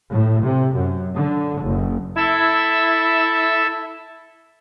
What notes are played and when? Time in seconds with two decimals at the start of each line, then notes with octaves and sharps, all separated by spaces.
0.11 A2
0.43 C3
0.75 F#2
1.14 D3
1.62 F#1
2.17 E4 A4 E5 E6